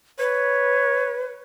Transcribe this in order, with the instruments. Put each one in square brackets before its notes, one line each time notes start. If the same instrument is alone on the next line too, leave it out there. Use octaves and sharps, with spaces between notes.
[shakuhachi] B4 [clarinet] C#5